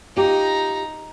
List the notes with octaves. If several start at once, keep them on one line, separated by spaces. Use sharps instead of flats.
D#4 F4 G4 A#5